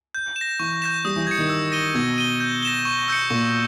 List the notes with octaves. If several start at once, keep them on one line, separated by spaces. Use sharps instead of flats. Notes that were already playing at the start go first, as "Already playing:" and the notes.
G6
E7
A#6
E3 C#6
G6 A#6 E7
G3 D#6
E3
E3 G#6 C#7
D#3
E6
A#6 D#7 G7
B2 G#6
D#7 G7
G6
A#6 E7 G7
C#6
E6 G6 C#7
A#2 C#6